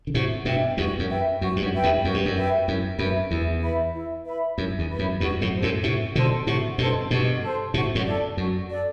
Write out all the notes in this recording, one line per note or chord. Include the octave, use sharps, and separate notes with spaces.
D3
A2 C3 F#4
G2 B2 B4 E5 G5
E2 G2 F#4
F#2
B4 E5 G5
F#2 F#4
G2
F#2
B4 E5 G5
E2 G2
F#2 F#4
G2
F#2
B4 E5 G5
F#2 E4
F#2 B4 E5 B5
E2 E4
B4 E5 B5
E4
B4 E5 B5
F#2 E4
E2
B4 E5 B5
F#2
E2 G2 F#4
F#2 A2
A4 C5
F#2 A2
A2 C3 F#4
B2 D3 A4 C5
A2 C3 F#4
G2 B2 A4 C5
G2 B2 F#4
A4 C5
A2 C3 F#4
F#2 A2
A4 D5
F#2 F#4
A4 D5